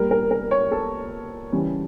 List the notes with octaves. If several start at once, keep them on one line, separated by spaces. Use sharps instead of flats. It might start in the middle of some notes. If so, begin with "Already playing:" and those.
Already playing: A#2 G3 A#4
A#4
A#4
C#5
A4
C#3 E3 G3